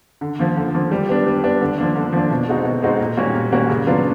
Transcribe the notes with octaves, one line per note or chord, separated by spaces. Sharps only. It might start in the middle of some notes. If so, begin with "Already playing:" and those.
D3
F3 A#3
D3
F3 A#3
G3
B3 D4
G3
B3 D4
D3
F3 A#3 D4
D3
F3 A#3 D4
B2
G#3 C4 D#4 F#4
B2
G#3 C4 D#4 F#4
A#2
G3 A#3 C#4 F#4
A#2
G3 A#3 C#4 F#4
C#3
F#3 B3 D4 F4